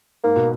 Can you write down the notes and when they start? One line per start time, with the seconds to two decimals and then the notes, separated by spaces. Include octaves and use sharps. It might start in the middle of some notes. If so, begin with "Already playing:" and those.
0.24 G#2 A#3
0.36 B2